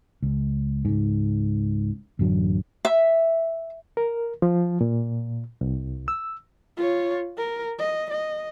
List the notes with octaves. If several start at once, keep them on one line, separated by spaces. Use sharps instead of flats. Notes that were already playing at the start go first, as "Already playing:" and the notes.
C#2
C#2 G#2
A1 F#2 D3 F#3
E5
A#4
F3
A#2
C2
E6
F4 C#5
A#4
D#5
D#5